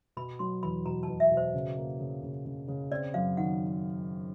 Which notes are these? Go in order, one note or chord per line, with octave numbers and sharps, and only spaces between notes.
B2 B5
F#3 C6
E2 B5
B2 A#5
B2 A5
E5
B2
C5
C#3
A#3
C#3
C#3
C#3
C#3
C4 D5
F#2 F5
D#3 F#5